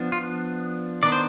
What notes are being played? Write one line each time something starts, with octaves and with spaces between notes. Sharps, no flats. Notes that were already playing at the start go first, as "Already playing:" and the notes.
Already playing: F3 B3 D4
F4
D#3 B3 D4 D5
C5